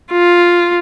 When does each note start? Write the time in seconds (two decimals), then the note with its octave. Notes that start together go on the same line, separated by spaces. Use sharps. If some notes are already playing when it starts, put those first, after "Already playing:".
0.12 F4